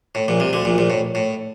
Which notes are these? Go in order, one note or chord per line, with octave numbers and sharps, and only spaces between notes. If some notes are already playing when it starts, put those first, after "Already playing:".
A2
A#1 A#2
C2 C3
D2 D3
A#1 A#2
A#1 A#2
A2
A2